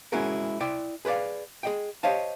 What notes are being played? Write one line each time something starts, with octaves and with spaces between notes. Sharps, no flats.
G#3 C#4 E4 F#4 G#4 A#4
E4 D5 G5
G#4 B4 C5 D5 F5
G#4 D#5 G5
G4 C5 C#5 D#5 F5 A5